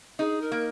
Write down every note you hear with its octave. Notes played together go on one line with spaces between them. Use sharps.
D#4 G#4
A#4
A#3